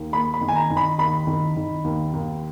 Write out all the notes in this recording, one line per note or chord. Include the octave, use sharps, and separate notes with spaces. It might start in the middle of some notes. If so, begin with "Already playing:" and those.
Already playing: D#2
A#3 B5
B5
D#3
G#5
A#5
D#3
B5
D#2 B5
D#3
D#3
D#2
D#2